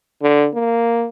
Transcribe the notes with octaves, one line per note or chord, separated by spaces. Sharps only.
D3
A#3